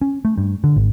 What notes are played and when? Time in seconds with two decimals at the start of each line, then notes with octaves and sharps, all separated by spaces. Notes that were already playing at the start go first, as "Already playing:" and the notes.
0.02 C#4
0.25 A3
0.38 G2
0.64 D3
0.76 G#1